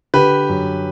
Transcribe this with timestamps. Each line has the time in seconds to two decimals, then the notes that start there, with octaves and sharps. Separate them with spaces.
0.14 D3 G4 B4
0.49 F#2